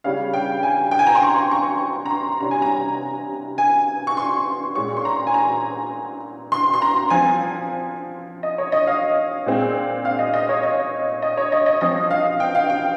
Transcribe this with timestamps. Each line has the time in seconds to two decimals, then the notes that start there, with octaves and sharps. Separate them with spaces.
0.04 C#3 G3 C#4 F5
0.33 G5
0.63 G#5
0.91 G5
0.99 G#5
1.07 A#5
1.15 C6
1.23 C#6
1.51 C#6
2.06 A#5
2.10 C6
2.40 C3 G3 C#4 A#5
2.51 G#5
2.62 A#5
3.58 G#5
4.07 C#6
4.17 C6
4.75 A#2 G#3 C#4 C#6
4.97 C6
5.05 A#5
5.27 G#5
5.34 A#5
6.52 C6
6.74 C6
6.82 A#5
7.10 F3 C4 G#5
8.43 D#5
8.58 C#5
8.72 D#5
8.87 F5
9.46 A#2 G#3 C4
10.05 F5
10.19 D#5
10.34 D#5
10.49 C#5
10.63 D#5
11.22 D#5
11.37 C#5
11.52 D#5
11.66 D#5
11.81 F3 C4 D#5
12.11 F5
12.40 G5
12.55 F5
12.70 G5